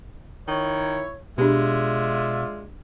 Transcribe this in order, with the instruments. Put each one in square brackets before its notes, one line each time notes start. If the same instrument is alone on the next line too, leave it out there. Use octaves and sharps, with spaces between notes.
[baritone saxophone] D#3 [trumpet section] E4 C#5
[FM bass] B2 [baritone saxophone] G#3 [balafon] D4 G4 [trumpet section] F4 D5 E5